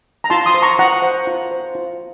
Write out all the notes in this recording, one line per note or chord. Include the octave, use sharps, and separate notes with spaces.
A#5
F4 A5 C6
C6 D#6
C5
A#5 C#6
F4 F#5 A#5
C5
F4
C5
F4